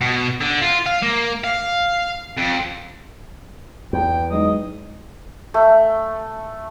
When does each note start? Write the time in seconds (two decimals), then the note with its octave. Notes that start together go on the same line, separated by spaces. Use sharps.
0.01 B2
0.41 D3
0.61 F4
0.86 F5
1.03 A#3
1.44 F5
2.37 F2
3.93 E2 G5
4.31 F#3 G#3 D#4 D#5
5.54 A3